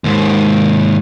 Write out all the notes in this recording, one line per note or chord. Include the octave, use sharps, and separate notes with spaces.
D#2 G#2